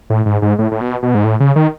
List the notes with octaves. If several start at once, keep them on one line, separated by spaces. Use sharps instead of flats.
A2
G#2
G#2
A2
A2
B2
B2
G#2
A2
C#3
D#3